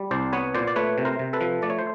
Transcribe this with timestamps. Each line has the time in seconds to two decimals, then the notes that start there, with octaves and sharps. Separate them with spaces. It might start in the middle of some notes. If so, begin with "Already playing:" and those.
Already playing: G3
0.11 C2 C5 D5
0.33 B3 B4 C#5
0.54 A#2 C5 D5
0.67 D5
0.76 A3 B4 C#5
0.98 C3
1.05 A#4 C5
1.19 C3
1.33 A4 B4
1.41 F3
1.62 A3 D5
1.70 C#5
1.79 C5